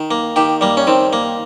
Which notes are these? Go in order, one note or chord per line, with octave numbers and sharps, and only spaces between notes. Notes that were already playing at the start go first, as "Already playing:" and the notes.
Already playing: D#3
A#3
D#3 G4
G3 A#3
C#4
D#3 C4
A#3